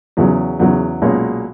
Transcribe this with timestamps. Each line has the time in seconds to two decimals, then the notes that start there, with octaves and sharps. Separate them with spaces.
0.17 E2 C#3 F#3
0.59 E2 C#3 F#3
1.02 B1 A#2 G#3 C#4 F#4